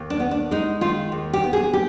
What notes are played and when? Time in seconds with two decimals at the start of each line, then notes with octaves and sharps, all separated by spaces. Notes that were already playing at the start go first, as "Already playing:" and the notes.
Already playing: D#2
0.10 D4
0.20 B3
0.31 D4
0.51 G#3 D#4
0.81 D#3 F4
1.12 D#2
1.33 G4
1.44 B3
1.53 G#4
1.73 G4